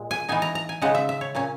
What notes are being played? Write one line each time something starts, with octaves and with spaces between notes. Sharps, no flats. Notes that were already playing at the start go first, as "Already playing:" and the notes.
Already playing: A#2 G#3
G#5
E3 B3 D#4 G#5
A#5
A#5
G#5
C#3 G#3 D#4 F#5
E5
E5
C#5
A#2 A#3 C#4